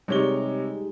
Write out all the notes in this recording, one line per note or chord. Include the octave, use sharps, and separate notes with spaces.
C3 G3 G#3 D#4 C#5 G7